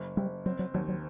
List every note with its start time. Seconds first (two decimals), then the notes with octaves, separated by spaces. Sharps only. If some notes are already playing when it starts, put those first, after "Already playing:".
Already playing: F#1
0.17 F#1 G3
0.46 F#3 C4
0.59 F#3
0.74 D#2 F#3
0.88 F#3